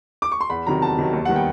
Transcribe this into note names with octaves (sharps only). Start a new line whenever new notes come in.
D6
C#6
C6
E2 B5
C3 D#3 F#3 A#5
E2 A5
C3 D#3 F#3
D#2
D#3 G3 B3 F#5
G5